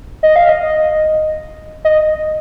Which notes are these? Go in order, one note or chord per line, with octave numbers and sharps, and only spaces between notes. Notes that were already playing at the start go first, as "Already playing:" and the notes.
D#5
F5
D#5
D#5